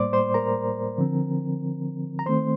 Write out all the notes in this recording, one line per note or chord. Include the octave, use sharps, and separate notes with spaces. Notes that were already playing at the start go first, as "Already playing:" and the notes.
Already playing: A2 G3 A#3 C5 D5 C6 D6
C5 C6
A#4 A#5
D3 F3 C4
A#5
D#3 A3 C4 C5 C6